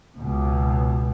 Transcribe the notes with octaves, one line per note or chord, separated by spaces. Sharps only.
C#2 B2